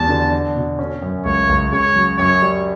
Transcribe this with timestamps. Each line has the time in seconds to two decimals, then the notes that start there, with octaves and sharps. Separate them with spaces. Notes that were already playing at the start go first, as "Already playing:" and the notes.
Already playing: E2 G3 A5
0.09 D3
0.32 D4
0.56 B2
0.79 C#4
1.02 F#2
1.25 C#2 C#5
1.49 C#2
1.72 C#3 C#5
1.95 F#3
2.18 F#2 C#5
2.42 G3